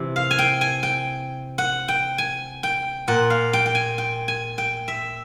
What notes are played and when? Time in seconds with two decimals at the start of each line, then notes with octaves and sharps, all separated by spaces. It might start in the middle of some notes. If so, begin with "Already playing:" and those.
Already playing: C3 E3
0.16 F5
0.31 G#5
0.39 G5
0.61 G#5
0.83 G5
1.58 F#5
1.88 G5
2.18 G#5
2.63 G5
3.08 A#2 F#5
3.30 F5
3.53 G5
3.66 G5
3.75 G#5
3.98 G5
4.28 G#5
4.58 G5
4.88 E5